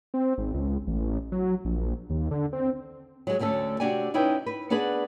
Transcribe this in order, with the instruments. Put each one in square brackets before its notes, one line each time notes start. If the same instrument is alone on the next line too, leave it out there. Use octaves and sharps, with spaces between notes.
[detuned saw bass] C4
G#1
C#2
A1
F#3
A#1
D#2
D3
C4
[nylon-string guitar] F#3 G#3
D2 D3 A3 C#4 A4
C3 D4 F#4 G4 D5 G#5
C#4 D#4 E4 B4 G5
B4
B3 D4 G#4 B4 D5 F#5